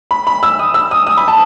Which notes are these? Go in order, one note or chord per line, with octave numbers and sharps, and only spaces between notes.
B5
B5
E6
D#6
E6
D#6
D#6
B5
A5